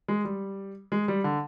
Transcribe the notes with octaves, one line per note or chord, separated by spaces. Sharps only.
G#3
G3
G#3
G3
D3